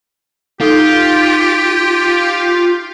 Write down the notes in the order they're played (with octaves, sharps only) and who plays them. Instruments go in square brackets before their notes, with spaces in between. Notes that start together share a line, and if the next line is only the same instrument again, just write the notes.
[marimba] D#4 A4 [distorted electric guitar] F4 [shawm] G4